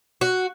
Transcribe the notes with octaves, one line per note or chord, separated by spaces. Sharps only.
F#4